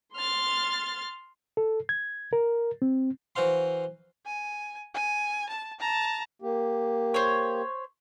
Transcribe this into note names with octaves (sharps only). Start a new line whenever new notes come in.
C6 F6 A6
A4
G#6
A#4
C4
E3 F#4 C5 F5 C6
G#5
G#5
A5
A5 A#5
A#3 G4
C5 C#5